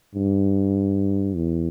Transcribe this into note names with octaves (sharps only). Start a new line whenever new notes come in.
G2
E2